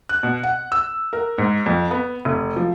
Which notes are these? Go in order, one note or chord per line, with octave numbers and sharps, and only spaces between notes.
F#6
B2
F#5
E6
A#4
G#2
F2
B3
F1
F3